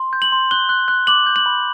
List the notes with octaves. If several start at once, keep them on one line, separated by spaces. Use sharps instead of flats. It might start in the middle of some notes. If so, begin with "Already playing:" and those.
Already playing: C6
G6
F#7
C6
F#6 G7
F#6
F#6
D6 F#7
G6
F#7
B5